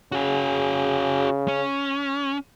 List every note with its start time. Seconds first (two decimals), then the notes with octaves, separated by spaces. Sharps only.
0.12 C#3 F#4 G#4
1.48 C#4